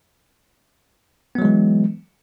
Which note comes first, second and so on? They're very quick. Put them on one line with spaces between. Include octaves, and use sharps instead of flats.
B3 F#3 G#3 E3